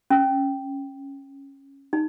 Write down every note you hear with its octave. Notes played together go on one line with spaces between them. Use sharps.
C#4
D#4